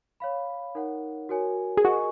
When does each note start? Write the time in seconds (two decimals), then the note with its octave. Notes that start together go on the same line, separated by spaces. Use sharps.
0.20 C#5 F5 B5
0.75 D#4 A#4 C#5 F#5
1.29 F#4 A#4 C#5 G#5
1.77 G#4
1.85 F#4 A#4 D#5 G#5 C#6